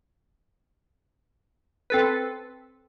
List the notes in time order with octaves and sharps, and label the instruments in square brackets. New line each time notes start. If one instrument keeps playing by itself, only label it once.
[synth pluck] C4 A4 B4